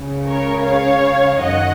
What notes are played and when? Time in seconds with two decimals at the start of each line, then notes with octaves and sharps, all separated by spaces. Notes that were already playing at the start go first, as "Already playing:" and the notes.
Already playing: C#2 C#3
0.27 A#4 C#5
0.65 C#5 F5
1.40 F#2 D#3 D#5 F#5